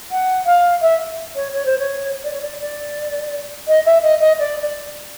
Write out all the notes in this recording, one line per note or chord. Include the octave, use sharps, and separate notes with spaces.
F#5
F5
E5
C#5
C#5
C5
C#5
D5
C#5
D5
D5
D#5
E5
D#5
D#5
D5
D5